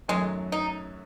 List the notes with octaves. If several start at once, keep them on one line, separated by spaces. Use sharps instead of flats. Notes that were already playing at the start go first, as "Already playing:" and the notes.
F#2 D#3 F#3 G#3 A3
D#4